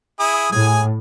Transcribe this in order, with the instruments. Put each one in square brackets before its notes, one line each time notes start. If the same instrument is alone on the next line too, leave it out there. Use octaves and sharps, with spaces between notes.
[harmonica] E4 G#4 D#6
[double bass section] A2 [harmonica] G#4 G#5